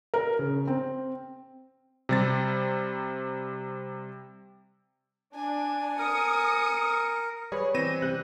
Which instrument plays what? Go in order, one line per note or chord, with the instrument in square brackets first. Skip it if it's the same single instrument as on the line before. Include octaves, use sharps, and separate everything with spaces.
[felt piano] A#4
C#3
C4
[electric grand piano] C3 G3 A6
[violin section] D4 [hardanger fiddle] G#5
[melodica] A#4 [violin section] D#6 C#7
[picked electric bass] G3 [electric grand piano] G#4 [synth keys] B4 C#5
[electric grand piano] E3 A#6 E7 [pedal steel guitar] C4 [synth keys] D#7
[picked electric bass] C3 G3 [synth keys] F#6